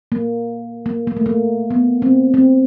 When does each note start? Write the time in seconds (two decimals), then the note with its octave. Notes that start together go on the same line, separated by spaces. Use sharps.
0.12 A#3
0.86 A#3
1.07 A#3
1.17 A3
1.26 A#3
1.71 B3
2.02 C4
2.34 C4